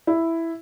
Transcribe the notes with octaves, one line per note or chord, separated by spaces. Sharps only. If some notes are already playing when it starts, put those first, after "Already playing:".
E4